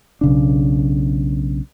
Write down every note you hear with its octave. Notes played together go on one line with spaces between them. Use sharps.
B1 C#3 D4